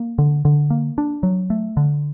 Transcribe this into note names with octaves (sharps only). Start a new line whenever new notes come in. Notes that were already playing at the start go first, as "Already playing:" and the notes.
Already playing: A#3
D3
D3
A#3
D4
F#3
A3
D3